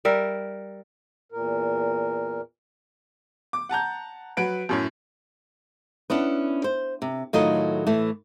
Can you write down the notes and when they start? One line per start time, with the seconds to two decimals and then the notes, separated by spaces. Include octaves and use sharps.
0.05 G3 A#4 E5
1.32 E2 A#2 A#4
3.53 D6
3.69 F#5 A5 A#5 G6
4.37 F#3 B4 F#5 D7
4.69 F#2 A2 C#4
6.10 B3 C#4 D4 E4
6.64 C5
7.02 C3
7.33 A2 D#3 F#3 F4 A4 D#5
7.87 A2 E3 A3